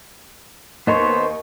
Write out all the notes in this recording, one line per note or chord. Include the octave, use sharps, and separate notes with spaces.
D#2 B3 C5 C#5 D#5 C#6